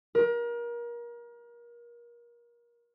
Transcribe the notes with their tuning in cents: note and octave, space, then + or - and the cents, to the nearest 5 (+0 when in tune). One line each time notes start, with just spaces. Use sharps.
A#4 +30